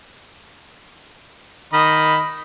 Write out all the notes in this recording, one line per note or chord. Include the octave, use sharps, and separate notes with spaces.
D#3 D#5 B5